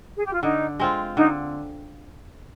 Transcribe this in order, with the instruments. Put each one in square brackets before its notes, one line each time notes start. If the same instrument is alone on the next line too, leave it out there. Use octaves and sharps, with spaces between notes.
[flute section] G#4
G4
F4
[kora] D3 [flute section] D#4
[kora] G#3 C4 F4
[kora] D3 [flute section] D#4